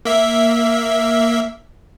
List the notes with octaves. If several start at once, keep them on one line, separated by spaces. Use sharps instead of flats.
A#3 E5